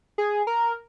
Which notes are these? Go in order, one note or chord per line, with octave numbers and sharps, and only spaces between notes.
G#4
A#4